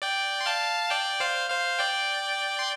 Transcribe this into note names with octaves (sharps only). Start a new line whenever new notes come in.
D5 G5
C6
F5 A5
D5 G5
C5 F5
C5 F5
D5 G5
C6